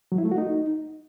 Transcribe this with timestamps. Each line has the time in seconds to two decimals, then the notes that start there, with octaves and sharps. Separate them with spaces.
0.12 F#3
0.18 E4
0.25 A3
0.31 F#4
0.38 D#4